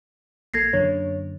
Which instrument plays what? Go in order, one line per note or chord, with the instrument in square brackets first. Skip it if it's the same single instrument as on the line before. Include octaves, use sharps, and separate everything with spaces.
[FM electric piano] A#1 A#3 A4 [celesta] G#6 A#6 C7
[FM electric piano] F#2 D3 A#3 [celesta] C#5